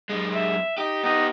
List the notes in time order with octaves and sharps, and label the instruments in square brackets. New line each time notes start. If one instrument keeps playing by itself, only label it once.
[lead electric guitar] F#2 G#3
[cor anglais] E5
[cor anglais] D#4 [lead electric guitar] G4
[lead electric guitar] B3 G4 [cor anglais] D#4